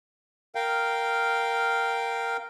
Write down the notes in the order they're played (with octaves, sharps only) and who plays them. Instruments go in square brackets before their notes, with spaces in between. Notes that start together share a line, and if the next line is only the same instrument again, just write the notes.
[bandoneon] A#4 F5 G5